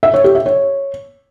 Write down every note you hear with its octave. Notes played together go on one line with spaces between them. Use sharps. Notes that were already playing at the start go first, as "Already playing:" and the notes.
E5
C#5
G4
E5
C#5